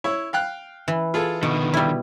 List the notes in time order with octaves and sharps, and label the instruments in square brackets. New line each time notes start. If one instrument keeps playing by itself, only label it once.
[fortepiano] E4 C#5
F5 G5 F#6
[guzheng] E3
[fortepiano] F4 G#4 A4
[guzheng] B2 [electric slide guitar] D3 D#3
[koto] G3 E4